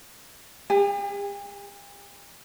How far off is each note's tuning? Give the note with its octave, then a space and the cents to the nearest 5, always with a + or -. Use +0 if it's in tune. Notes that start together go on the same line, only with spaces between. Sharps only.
G4 +45 G#5 +0